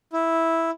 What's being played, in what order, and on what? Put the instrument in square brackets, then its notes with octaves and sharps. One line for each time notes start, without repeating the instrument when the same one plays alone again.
[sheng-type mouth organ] E4